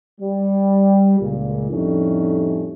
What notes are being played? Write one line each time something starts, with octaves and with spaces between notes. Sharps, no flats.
G3
C#2 A#2
F2 A2 G3 A3 C#4 D#4